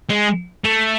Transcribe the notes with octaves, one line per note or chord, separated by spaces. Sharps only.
G#3
A3